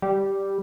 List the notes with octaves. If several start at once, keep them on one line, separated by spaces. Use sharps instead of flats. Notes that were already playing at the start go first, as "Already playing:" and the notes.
G3